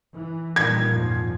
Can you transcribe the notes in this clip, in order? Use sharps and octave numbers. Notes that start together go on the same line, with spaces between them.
E3
A#2 D#3 G3 G#6
F2 G#2 F3